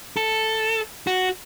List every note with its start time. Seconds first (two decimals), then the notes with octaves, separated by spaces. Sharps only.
0.17 A4
1.07 F#4